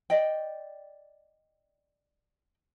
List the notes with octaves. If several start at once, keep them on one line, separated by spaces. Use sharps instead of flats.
D5 D#5 G5